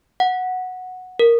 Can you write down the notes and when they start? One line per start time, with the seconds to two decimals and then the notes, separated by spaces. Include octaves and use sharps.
0.20 F#5
1.19 A#4